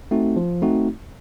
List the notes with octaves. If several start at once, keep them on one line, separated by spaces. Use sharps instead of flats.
A3 C4 D#4 F#4
F3
A3 C4 D#4 F#4